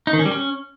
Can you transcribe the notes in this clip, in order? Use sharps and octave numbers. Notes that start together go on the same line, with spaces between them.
D#4
D#3
C#4
G3
C#4